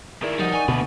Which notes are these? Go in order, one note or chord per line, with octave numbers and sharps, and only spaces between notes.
D#3 E4 G#4 A#4 D5
F3 G3 D#4 F#5 D#6 A6
D5 G#5 C#6
D2 B2 A#3 B4